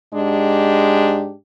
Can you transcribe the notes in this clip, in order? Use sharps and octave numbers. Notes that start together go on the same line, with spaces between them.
G#2 G#3 D4 G4